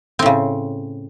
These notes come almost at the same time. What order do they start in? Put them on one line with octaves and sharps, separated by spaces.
C4 A2 C#3